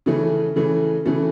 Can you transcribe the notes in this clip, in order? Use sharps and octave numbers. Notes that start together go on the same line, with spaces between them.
C#3 E3 A3 C#4
C#3 E3 A3 C#4
C#3 E3 A3 C#4